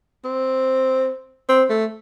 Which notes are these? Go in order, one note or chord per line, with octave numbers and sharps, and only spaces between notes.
C4
C4
A3